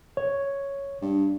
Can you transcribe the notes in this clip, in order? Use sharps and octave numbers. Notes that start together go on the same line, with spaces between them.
C#5
G2